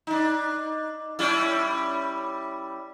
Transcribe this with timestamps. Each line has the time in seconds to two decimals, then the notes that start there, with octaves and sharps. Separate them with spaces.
0.07 D4 D#4
1.19 G3 C#4 E4